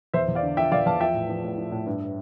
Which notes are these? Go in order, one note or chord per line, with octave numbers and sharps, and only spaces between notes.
E2 C5 E5
E2
D5 F5
D3
F3 E5 G5
E2 D5 F5
E2 F5 A5
F3 E5 G5
A2
F3
A2
F3
A2
G2